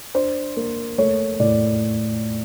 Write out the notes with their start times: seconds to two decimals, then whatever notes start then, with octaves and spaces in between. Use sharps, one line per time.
0.14 D4 C5
0.57 A#3
0.98 A3 C#5
1.40 A2 D5